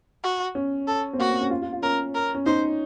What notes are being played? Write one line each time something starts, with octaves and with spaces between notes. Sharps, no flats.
F#4
C#4
A4
C4
A#3 F#4
C4
C#4
F4
F4
F4
C#4 A#4
A#4
C#4
D#4 C5